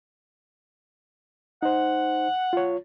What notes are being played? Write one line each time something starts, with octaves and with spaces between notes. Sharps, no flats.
D#4 C5 F#5
F4 C#5